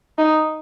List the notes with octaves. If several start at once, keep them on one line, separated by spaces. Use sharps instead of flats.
D#4